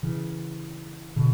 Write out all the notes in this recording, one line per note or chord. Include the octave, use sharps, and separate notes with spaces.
C#3 E3
B2 D3